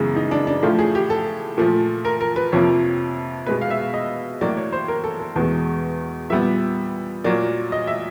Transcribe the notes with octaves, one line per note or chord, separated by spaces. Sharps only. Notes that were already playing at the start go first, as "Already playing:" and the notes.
Already playing: F#2 C#3 E3 G#3 B3
D#4
D4
D4
A2 F3 A3 F4
G#4
G4
A4
A#2 F3 A3
A#4
A#4
B4
F2 C3 F3 A#3 C#5
B2 G#3 B3 B4
F5
E5
D#5
A2 F#3 A#3 D5
C#5
C5
A#4
A4
A4
E2 B2 G#3
A#2 G3 B3 E5
A#2 F#3 A#3 D5
D#5
E5